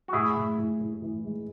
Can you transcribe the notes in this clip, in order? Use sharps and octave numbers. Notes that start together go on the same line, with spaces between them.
F#4
A2 E4 G#4
A2
A2
A2
E3
G#3